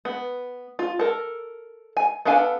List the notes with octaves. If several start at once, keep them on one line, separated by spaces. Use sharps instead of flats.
B3
F4
A4 A#4
G#5
B3 D4 A4 F5 G#5